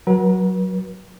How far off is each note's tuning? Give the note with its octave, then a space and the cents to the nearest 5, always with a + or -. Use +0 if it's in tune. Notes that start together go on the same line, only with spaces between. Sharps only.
F#3 +0 B4 -45